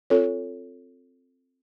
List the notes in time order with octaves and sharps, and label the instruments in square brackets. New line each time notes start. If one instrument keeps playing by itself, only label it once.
[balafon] C4 F4 A4 C#5